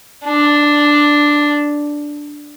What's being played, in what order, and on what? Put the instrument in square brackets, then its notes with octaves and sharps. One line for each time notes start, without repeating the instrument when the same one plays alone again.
[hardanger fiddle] D4